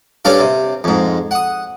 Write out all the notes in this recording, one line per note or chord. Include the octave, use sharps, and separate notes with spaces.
G2 C#4 D4 A4 F5
C3
F2 G#2
F#5 D#6